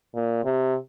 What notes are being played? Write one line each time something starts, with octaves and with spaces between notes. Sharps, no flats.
A#2
C3